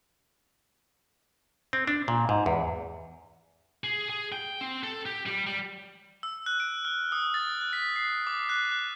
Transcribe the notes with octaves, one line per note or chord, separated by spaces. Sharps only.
C4
D4
A#2
G#2
E2
G#4
G#4
G5
C4
A4
G4
G3
G3
E6
F#6
D7
F6
D#6
A6
F#6
B6
C7
D6
F#6
F#6